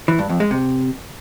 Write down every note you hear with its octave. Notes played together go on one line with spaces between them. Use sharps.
E3
G2
F2
G#3
C3